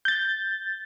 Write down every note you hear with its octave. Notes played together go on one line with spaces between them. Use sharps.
G6 A6